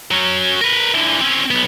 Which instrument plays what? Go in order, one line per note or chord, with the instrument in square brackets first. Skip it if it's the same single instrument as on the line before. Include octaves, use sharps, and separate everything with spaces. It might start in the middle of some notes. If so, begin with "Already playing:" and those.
[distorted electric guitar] F#3 C#4
A#4 B4
D3 E3
C4 C#4
B1 B3